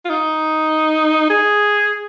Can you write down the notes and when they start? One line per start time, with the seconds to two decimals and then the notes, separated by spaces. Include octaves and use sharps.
0.05 F4
0.10 D#4
1.30 G#4